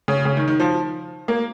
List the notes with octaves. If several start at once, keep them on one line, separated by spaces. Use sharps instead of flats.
C#3
C#3
D#3
D#3
F3
A#3